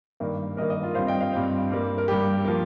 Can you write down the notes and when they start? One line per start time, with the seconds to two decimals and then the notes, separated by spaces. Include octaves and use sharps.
0.20 G2 D#3 A#3
0.57 G2 D#3 A#3 A#4 D#5
0.70 A#4 D#5
0.82 F4 A#4
0.95 G2 G3 C4 C5 F5
1.07 D#5 G5
1.20 C5 F5
1.33 G2 G3 C4
1.70 G2 G3 A#3
1.98 A#4
2.08 G2 G3 A#3 G4
2.45 F3 A#3